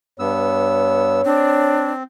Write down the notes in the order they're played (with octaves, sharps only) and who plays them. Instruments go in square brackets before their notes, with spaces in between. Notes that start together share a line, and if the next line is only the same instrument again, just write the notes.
[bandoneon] G2 B3 E6 [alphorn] C#5
[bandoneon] C4 [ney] D4